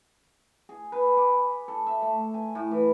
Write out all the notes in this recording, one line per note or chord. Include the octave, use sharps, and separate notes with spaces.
G#4
B4
D6
A4
E5
A3
G#5
A2
E3